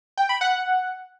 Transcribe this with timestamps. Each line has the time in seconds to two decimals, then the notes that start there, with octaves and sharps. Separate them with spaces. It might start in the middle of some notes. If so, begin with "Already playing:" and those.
0.18 G5
0.29 B5
0.41 F#5